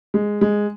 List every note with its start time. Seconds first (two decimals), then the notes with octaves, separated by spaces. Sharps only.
0.14 G#3
0.41 G#3